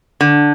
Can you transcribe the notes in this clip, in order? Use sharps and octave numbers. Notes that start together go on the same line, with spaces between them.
D3